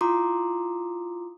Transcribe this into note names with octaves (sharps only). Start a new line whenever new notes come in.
E4 F4 A#5 C6 D6 D#6